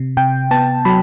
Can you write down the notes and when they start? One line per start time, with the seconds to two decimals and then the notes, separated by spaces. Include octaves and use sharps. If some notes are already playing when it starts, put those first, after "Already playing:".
Already playing: C3
0.17 C3 G5
0.51 B3 A5
0.85 F#3 B5